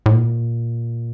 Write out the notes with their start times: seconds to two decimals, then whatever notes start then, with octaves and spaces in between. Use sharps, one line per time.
0.06 A2
0.13 A#2